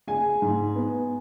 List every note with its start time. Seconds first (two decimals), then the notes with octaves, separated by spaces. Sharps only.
0.07 G#3 G#5
0.42 G#2
0.75 B3